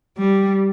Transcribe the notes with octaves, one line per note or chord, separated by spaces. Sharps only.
G3